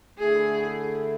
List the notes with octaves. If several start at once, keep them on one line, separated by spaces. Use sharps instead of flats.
D3 A3 E4 G#4